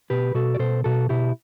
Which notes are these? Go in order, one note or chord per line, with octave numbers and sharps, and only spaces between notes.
B2 G4 B4
B2 F#4 A4
D5
B2 A4 C5
B2 F#4 A4
B2 E4 G4